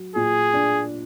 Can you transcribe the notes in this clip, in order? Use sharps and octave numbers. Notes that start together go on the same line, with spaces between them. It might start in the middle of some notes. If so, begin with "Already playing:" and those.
Already playing: F#3
A#2 G#4
D4